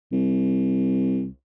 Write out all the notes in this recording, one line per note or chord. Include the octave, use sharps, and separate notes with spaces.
C2